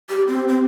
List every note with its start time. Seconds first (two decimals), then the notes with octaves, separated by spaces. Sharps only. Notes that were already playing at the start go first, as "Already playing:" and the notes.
0.10 G4
0.28 C4
0.48 C4